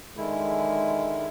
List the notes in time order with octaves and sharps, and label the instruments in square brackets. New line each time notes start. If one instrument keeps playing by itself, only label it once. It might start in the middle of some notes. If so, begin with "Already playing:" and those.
[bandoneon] D3 D#3 E4 [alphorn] G#3